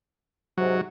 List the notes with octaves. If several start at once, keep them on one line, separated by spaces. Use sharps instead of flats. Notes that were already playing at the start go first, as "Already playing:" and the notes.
G#2 C3 F#3